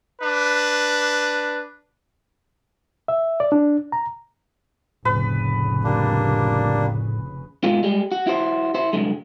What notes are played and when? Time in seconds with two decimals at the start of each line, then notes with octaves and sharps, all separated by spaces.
0.22 D4 B4
3.08 E5
3.40 D5
3.52 D4
3.92 A#5
5.05 F1 A2 C#3 B4
5.84 G3 A#3 D4
7.64 G#2 B2 G#3 F4
7.83 G3 G#3
8.12 F#4
8.27 E4 F#4 C5
8.74 E4 C5
8.93 C2 F#2 D3 G#3